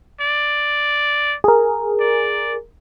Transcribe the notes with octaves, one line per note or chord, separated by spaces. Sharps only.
D5
G#4 A#4
D5